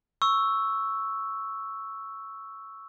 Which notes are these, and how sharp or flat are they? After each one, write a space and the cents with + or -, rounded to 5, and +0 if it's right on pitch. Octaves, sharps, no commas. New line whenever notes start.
C#6 +0 E6 +0